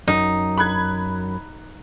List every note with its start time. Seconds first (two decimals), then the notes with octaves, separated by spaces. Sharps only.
0.08 F#2 D#4
0.58 B5 F#6 G#6